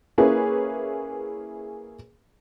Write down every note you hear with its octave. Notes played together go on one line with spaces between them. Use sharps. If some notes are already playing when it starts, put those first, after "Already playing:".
A#3 C#4 E4 G#4 B4